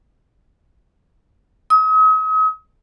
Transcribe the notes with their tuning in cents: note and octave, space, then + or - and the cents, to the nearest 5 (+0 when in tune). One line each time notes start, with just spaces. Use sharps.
D#6 +40